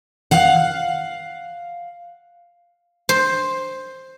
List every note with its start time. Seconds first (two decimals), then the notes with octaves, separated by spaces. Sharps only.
0.31 F5 F#5
3.09 C5